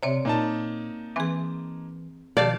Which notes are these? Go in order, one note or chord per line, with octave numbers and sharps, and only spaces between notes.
C3 C4 C#5 D5
A#2 A#3 D#4 A5
E3 C4 G#4
B2 D#3 F3 G4 D5 F5 A5